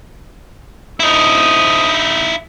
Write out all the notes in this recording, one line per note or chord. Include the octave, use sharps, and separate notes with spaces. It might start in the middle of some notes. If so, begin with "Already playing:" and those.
D#4 E4 A4 C5 D#6